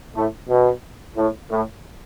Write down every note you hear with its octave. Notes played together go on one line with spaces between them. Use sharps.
A2 A3
B2
A2
A2